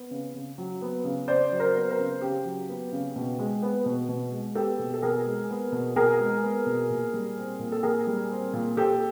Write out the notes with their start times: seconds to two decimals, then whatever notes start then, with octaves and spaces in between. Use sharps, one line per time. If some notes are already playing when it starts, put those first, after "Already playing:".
Already playing: B3
0.11 C#3
0.34 C#3
0.58 F#3
0.82 B3
1.04 C#3
1.27 C#3 C5 D5
1.52 F#3
1.60 A#4 C5
1.75 B3
1.91 A#4 C5
1.99 C#3
2.21 C#3 G4
2.45 F#3
2.69 B3
2.92 C#3
3.16 B2
3.39 G#3
3.62 B3
3.86 B2
4.09 B2
4.32 G#3
4.55 B3 G4 A4
4.79 B2
4.94 A4
5.02 B2 G#4 A#4
5.26 G#3
5.50 B3
5.72 B2
5.96 B2 G#4 A#4
6.20 G#3
6.43 B3
6.66 B2
6.90 A#2
7.13 G3
7.37 C4
7.59 A#2
7.72 A4
7.83 A#2 G#4 A#4
8.07 G3
8.30 C4
8.54 A#2
8.77 A#2 G4 A4